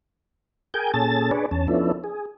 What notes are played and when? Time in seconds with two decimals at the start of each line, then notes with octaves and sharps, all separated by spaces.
0.74 G#4 A#4 G5 G#5 G6
0.94 A#2 C#4 G#4 A4 A5 A6
1.31 D4 G#4 B4 C#5 D5
1.51 E2 C#4 A5
1.68 F3 B3 C#4 D4 E4 A4
2.04 G#4